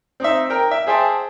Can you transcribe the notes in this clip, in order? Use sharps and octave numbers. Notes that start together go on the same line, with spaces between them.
C4 D#4 E5
A#4 G5
E5
G#4 C5 E5 G5 A5